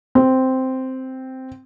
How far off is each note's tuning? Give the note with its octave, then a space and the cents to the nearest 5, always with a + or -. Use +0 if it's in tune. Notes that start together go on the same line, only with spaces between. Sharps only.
C4 -5